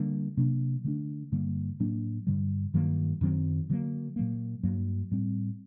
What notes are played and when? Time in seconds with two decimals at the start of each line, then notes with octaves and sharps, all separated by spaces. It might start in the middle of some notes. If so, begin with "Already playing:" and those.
Already playing: D3 G3 A#3 D4
0.37 C3 F#3 A#3 D4
0.84 D3 A3 D4
1.32 G2 D3 G3 A#3
1.80 A2 F#3 A#3 D4
2.27 G2 D3 G3
2.74 G2 D#3 F#3 A#3
3.21 F#2 D#3 F#3 C4
3.70 D3 F#3 A#3
4.16 A#2 F#3 A#3
4.63 G2 F#3 A#3
5.12 A2 G3 C4